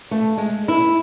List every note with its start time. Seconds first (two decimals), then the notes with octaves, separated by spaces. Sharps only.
0.11 A3
0.38 G#3
0.68 E4